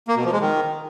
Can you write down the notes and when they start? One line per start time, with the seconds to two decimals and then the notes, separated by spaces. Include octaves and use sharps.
0.08 A#3
0.16 B2
0.24 F3
0.33 G#3
0.41 D#3